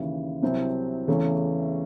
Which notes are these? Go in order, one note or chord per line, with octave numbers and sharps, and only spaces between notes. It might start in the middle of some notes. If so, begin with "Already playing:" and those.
Already playing: D#2 C#3 E3
C2 C3 F#3 C4 E4
E2 C#3 E3 A3 C#4